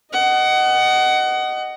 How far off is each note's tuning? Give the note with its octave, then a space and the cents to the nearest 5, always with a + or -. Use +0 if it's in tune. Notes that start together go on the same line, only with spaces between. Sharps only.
D#5 -5 F#5 +25